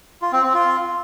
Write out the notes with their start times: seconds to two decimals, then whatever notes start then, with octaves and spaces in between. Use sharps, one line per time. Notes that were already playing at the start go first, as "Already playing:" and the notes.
0.22 F4
0.33 C4
0.43 C4
0.54 F4